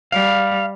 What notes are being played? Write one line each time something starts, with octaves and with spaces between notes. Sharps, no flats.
G3 F5